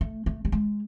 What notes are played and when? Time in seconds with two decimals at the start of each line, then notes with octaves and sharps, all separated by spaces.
0.01 A3
0.26 A3
0.45 G3
0.52 G#3